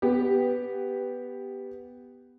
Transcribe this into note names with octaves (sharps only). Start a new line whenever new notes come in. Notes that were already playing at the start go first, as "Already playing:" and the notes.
B3 G4